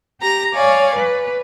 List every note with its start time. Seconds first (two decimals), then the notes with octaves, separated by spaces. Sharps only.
0.21 G4 A#5 A#6
0.54 C#5 D5 F5 G#5
0.97 B4